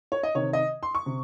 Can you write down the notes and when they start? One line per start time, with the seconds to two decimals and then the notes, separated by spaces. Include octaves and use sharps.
0.12 C#5
0.23 D#5
0.35 C3 D#3 C#5
0.53 D#5
0.83 C6
0.95 C#6
1.06 C3